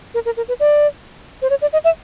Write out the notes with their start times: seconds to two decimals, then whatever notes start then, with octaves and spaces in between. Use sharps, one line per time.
0.14 A#4
0.26 A#4
0.37 A#4
0.48 B4
0.60 D5
1.42 C5
1.50 C#5
1.62 D5
1.73 D#5
1.84 E5